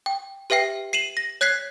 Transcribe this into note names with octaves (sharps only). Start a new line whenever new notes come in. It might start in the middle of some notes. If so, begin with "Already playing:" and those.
G5
G4 B4 E5 G5 C7
C7 D#7 E7 F#7
A#6
C#5 F#6 G#6 B6 C7